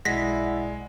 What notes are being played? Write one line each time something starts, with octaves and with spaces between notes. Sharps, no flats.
B1 G#3 E4 D5 F#5 A#6 B6